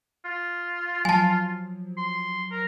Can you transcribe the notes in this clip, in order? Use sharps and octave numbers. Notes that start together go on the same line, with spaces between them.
F4
F3 F#3 G#5 A5
C6
A#4